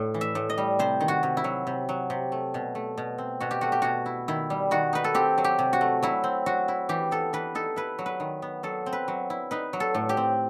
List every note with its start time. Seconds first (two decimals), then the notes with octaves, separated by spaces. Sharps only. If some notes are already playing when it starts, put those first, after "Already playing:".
Already playing: A2
0.14 E3
0.21 E5
0.35 A2
0.50 D#5
0.58 G3
0.79 C3 C5
1.01 D#3
1.08 F#4
1.23 C3
1.37 E4
1.44 F#3
1.67 C3
1.89 F#3
2.10 C3
2.32 A3
2.54 B2
2.75 A3
2.98 B2
3.18 C4
3.40 B2 F#4
3.51 G4
3.61 A3 F#4
3.72 G4
3.82 B2 F#4
4.06 E4
4.28 D#3 E4
4.50 G3
4.71 D#3 F#4
4.93 D#4 B4
5.04 A4
5.14 C4 G4
5.38 F#3
5.44 G4
5.59 C3
5.73 F#4
5.81 A3
6.03 F#3 E4
6.24 C4
6.46 F#3 F#4
6.68 E4
6.89 E3 G4
7.11 B3 A4
7.33 E3 B4
7.55 D#4 A4
7.76 E4 B4
7.99 F#3
8.06 B4
8.20 D#3
8.42 B3
8.63 F#3 A4
8.86 C4
8.93 B4
9.08 F#3
9.30 E4
9.51 D#4 B4
9.73 F#3
9.80 A4
9.95 A2
10.09 G4
10.17 C4